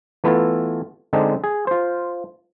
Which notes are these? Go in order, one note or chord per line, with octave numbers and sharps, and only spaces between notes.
E3 A3 B3 E4 F4 A4
D3 G#3 C4 D4 D#4
G#4
F4 C5